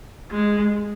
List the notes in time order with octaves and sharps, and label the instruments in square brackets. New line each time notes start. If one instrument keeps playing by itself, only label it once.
[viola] G#3